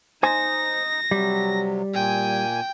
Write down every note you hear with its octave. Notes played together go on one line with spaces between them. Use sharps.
D#4 C5 G#5 A#6
C3 F#3 G3
A#2 G5 G#5